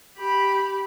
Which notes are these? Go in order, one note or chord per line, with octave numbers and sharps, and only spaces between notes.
G4 B5